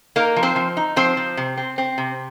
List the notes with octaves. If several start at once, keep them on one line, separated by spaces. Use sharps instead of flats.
A#3 D#4 A#4
F3
C4 C5
F3
D#4
F3 C4 C5
F3
C3
C4
C4
C3